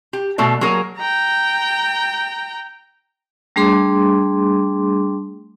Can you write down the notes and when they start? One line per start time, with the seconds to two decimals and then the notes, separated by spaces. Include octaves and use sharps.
0.13 G4
0.38 B2 A3 A4 D5
0.61 F#3 A#3 G#4 A#4
0.97 G5 A#5
3.56 G3 A3 D4 G#4 C6 D6